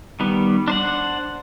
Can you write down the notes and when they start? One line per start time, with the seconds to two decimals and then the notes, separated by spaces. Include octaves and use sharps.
0.20 D#3 G3 B3
0.68 D4 C5 F#5